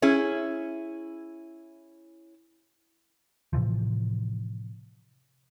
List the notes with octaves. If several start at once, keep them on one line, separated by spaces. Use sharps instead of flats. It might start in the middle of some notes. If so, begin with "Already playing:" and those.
C#4 E4 G#4
A2 C3 E3 F3